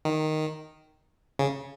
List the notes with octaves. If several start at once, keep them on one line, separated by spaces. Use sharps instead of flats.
D#3
C#3